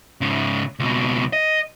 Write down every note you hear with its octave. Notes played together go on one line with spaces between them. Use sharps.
G#2 C#3
C#2 B2
D#5